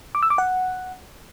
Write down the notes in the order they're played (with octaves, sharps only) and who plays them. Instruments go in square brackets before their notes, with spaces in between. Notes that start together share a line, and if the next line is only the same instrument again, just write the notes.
[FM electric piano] D6
E6
D6
F#5